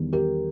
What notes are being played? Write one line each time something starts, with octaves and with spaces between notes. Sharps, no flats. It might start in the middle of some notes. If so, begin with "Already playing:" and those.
Already playing: E2 D#3 G3
G4 A#4